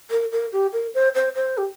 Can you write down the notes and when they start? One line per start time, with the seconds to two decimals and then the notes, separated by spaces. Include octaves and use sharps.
0.11 A#4
0.32 A#4
0.53 G4
0.73 A#4
0.94 C5
1.15 C5
1.35 C5
1.58 G4